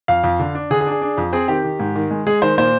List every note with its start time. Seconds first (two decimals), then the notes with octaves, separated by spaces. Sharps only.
0.08 F2 F5
0.24 F2
0.39 D3
0.55 D4
0.71 D3 G#4
0.81 G#4
0.86 D4
0.91 G#4
1.02 D4
1.17 F2
1.33 C4 G#4
1.48 D#3 G4
1.64 D#3
1.80 G#2
1.95 D#3
2.11 G#3
2.26 G#3 G#4
2.42 D#3 C5
2.58 A#2 C5